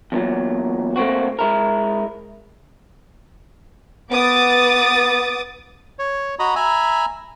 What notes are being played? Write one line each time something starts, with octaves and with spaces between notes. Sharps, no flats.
E2 A#2 F#3
A3 A#3 C4 F#4
G#3 E4 A#4
B3 D6 D#6 A6
C#5
F#4 D#5 A#5 B5 D#6
E5 G#5 A#5 B5